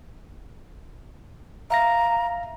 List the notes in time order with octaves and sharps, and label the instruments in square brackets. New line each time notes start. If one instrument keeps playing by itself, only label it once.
[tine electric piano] E5 F5 A#6 [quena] A#5